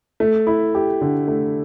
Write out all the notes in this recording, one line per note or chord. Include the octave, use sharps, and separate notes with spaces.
A3
E4
G4
D3
A3